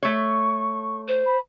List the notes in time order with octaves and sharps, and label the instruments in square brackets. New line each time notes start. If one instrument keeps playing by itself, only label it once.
[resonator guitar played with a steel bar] A3 C#5 [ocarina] C#6
[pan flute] C5
[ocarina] B5